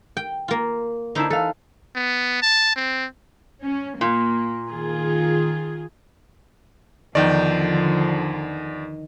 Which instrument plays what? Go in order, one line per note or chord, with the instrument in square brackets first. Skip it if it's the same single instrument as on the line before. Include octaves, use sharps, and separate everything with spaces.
[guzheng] G5
A#3 F4
[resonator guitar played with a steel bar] D3 E4 A5 [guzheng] D#4 C5
[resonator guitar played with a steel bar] E3 F5 [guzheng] A4
[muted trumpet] B3
A5
C4
[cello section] C#4
[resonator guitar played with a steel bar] A#2 [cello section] A#3
[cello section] D#3 F4 G#4
[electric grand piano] E2 D5 [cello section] D3 F3 [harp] D#3 G6